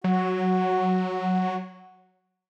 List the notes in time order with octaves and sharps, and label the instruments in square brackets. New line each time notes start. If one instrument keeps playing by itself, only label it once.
[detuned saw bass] F#3 [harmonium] F#4